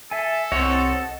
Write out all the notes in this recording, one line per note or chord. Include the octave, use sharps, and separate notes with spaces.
A4 E5 G#5
C2 C4 C#5 D#5 F#5 C6